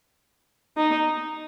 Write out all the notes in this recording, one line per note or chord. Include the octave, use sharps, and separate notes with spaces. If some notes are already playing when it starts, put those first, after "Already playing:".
D#4